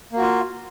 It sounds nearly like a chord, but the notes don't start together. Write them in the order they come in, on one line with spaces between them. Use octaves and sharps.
A#3 F#4 F4